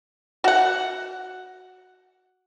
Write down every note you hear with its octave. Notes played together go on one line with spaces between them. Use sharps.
F#4 F#5